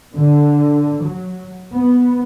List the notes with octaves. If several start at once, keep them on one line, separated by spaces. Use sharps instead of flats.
D3
F#3
B3